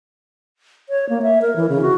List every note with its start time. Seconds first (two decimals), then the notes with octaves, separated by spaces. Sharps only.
0.89 C#5
1.09 A#3
1.22 E5
1.42 A#4
1.56 E3
1.69 C#3
1.82 F#4